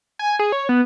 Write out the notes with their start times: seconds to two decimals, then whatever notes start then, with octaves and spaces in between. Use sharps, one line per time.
0.19 G#5
0.39 G#4
0.52 C#5
0.69 B3